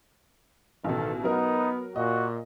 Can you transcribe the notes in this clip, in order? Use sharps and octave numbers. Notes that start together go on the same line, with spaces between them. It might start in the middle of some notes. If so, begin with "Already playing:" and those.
A1 B2 D#3 A4
F#3 B3 D#4 A#4
A#2 F#4 D#5